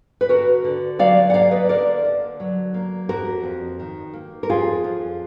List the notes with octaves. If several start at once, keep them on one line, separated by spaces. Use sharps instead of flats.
B4
D3 F#4 A#4
D3
F#3 D5 F5
F#5
A#3 D5 F5
B4 D#5
D3 A#4 D5
D3
F#3
A#3
F2 F#4 A#4
F2
D#3
A#3
A#4
F2 F4 G#4
F2